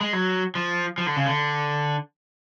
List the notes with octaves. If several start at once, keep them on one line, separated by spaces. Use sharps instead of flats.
G#3
F#3
F3
F3
D3
C#3
D3